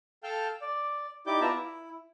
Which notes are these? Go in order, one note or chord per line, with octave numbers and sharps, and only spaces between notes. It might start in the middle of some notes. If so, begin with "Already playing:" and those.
A4 F5 G5 A5 F6 G6
D5
D#4 E4 G4 D5 D6 G6
B3 F4 D5 E5 A5 A#5
E4